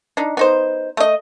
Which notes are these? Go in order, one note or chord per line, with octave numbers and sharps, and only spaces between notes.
D4 D#4
B3 D#4 C5
A3 D#5